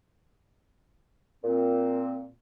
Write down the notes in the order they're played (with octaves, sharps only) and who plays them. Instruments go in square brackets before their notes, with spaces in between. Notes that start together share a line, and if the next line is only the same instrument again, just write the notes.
[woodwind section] A#2 C4